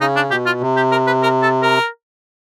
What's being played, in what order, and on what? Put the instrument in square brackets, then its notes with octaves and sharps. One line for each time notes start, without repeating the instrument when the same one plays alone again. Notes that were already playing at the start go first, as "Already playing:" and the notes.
[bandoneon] C#3 [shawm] D#4
[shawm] D4
[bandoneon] B2 [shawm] G4
[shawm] F4
[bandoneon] C3
[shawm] G4
A#4
B4
A#4
A4
A#4